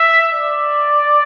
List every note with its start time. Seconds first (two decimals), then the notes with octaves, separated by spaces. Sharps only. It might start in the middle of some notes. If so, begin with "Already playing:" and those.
Already playing: E5
0.33 D5